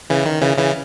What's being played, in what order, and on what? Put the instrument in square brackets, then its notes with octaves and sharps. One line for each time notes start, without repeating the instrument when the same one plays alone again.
[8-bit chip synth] C#3 E3
D#3
C#3 E3
C#3 E3